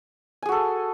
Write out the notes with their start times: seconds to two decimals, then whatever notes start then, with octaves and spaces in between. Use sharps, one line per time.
0.42 G#5
0.46 G#4
0.49 F#4
0.52 A4